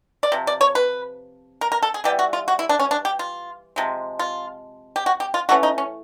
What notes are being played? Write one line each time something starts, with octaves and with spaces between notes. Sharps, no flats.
D5
C3 F3
D5
C#5
B4
A#4
A#4
A4
G#4
E3 G3 B3 G4
F#4
F4
F#4
E4
D4
C#4
D4
G4
F4
C3 F3 G#3
F4
G4
F#4
G4
F4
E3 A3 C#4 F#4
D#4
C#4